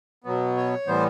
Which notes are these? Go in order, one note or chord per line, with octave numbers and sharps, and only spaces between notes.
B2 F#3 B3
C#5
A2 E3 G3 B3 C5